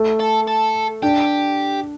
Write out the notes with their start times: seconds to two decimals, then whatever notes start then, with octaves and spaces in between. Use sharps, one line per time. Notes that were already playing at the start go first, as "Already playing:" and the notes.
Already playing: A3
0.20 A4
0.47 A4
1.02 D4 G4